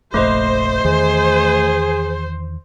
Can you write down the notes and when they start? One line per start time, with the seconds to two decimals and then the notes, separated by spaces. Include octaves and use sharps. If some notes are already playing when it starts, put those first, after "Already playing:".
0.14 F1 A#1 A3 C5 D#5
0.85 E2 D#3 E3 G#4